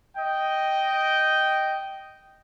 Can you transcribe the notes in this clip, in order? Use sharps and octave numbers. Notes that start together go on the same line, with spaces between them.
D#5 G5